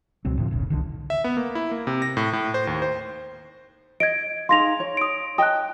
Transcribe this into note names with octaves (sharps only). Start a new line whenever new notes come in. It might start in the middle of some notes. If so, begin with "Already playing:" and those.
C#2 B2 F#3 C4
A2 D3 F3
E1 B1 C#3
C2 D3 D#3
E5
B3
A#3
E4
A#3
C3
A#6
A2
A2
C5
D#2
C5
D#5 G#6 D7
D#4 G#4 F5 C6 A#6 F7
C#5
D#6 D7
D#5 G5 A5 D#6 F#6